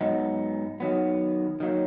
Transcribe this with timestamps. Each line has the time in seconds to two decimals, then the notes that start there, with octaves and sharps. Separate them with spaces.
0.01 G#2 F#3 B3 D#4
0.80 D#3 F#3 B3
1.60 D#3 F#3 A#3